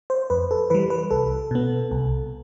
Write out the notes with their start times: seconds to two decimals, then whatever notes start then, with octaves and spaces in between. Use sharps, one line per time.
0.10 C5
0.30 F2 B4
0.51 A4
0.70 E3 G3 B4
0.90 B4
1.11 C2 A4
1.51 B2 B3
1.91 C2